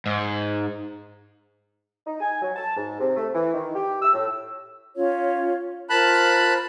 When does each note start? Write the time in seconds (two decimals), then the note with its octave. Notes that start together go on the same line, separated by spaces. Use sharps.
0.06 G#2
2.06 D#4
2.21 G#5
2.42 F#3
2.56 A5
2.77 G#2
3.00 C3
3.16 A3
3.34 E3
3.54 D#3
3.75 G4
4.02 E6
4.13 A2
4.96 C#4 F4 C#5
5.90 F4 A#4 C5 A5 B5 F#6